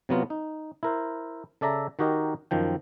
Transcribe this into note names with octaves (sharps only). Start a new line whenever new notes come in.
C3 F#3 B3 F4
D#4
E4 A#4 C5
C#3 A4 D5 E5 A#5
D#3 D#4 F#4 G4 A#4 D#5
F#2 D#3 F3 G5